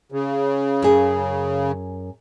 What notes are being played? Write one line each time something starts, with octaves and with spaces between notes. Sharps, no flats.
C#3
F#2 G#4